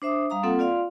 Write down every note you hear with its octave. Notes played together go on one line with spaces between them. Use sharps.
D4 C5 E5 D6 D#6
G3 F5 A#5 D#6
A#3 C4 F4 A4 F#5
F4 D5 F5 C6